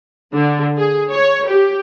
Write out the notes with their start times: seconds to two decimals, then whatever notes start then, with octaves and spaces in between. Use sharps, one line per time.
0.35 D3
0.77 G#4
1.13 C#5
1.49 G4